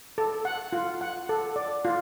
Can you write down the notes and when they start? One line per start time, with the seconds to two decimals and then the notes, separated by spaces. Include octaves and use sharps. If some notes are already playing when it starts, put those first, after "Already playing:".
0.18 A4
0.45 F#5
0.73 F4
1.01 F#5
1.29 A4
1.56 D5
1.85 F4